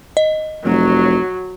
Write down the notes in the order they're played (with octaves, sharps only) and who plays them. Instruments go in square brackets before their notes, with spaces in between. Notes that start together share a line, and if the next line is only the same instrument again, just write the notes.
[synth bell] D#5
[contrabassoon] F1 [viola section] F#3